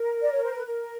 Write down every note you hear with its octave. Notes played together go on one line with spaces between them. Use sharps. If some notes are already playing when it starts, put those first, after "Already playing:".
Already playing: A#4
D5
C#5
C5
B4
A#4